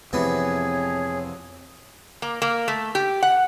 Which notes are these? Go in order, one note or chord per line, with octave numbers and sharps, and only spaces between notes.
F2 C3 E3 B3 G#4 C#5
A#3
A#3
A3
G4
F#5